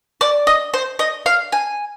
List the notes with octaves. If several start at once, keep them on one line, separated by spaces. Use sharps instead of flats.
D5
D#5
C5
D#5
F5
G#5